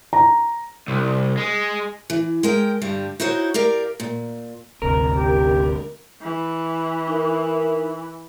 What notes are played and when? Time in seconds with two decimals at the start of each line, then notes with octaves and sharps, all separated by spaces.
0.13 A#5
0.88 C2
1.38 G#3
2.10 E3
2.43 G#3 A#4 G5
2.82 G2 D3 G3
3.20 D#4 E4 F#4 C5 C#5
3.54 G4 A#4 D5 F5
4.00 A#2
4.82 G1 D2 C3 A#4
5.13 G4
6.21 E3
7.08 D#4 A#4 E5